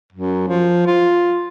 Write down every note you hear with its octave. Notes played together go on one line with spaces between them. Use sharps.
F#2
F3
F4